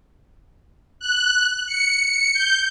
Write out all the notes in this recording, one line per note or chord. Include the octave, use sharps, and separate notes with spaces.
F#6
C#7
G6